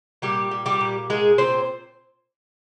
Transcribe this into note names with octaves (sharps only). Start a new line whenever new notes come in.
A#2 G3 G4
G3
G3 G4
A#2
A#2 G#3 G#4
A#2 C4 C5